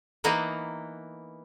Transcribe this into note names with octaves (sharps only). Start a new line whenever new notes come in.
E3 A#3 B3 D#4 B4